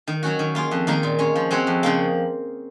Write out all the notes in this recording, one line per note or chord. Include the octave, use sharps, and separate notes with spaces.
D#3
F#3 C#4 F#4
D#3
A#3 F4 G#4
F2
D#3 A#3 D#4 A#4
A#2
G#3 C#4
F3
G#3 C4 F#4 C#5
F2
C#3 F3 A#3